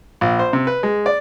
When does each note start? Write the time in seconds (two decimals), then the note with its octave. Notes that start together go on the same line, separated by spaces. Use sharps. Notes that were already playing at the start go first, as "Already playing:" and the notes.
0.21 A#1
0.39 C5
0.53 C3
0.67 B4
0.83 G#3
1.06 D5